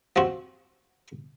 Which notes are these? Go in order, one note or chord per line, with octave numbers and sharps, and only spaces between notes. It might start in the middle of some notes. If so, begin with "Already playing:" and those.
F3 C4 F#4